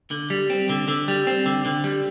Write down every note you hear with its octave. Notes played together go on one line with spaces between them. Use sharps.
D3
G3
C4
D3
D3
G3
C4
D3
D3
G3